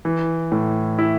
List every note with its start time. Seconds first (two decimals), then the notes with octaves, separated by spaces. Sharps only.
0.05 E3
0.52 A2
0.99 E4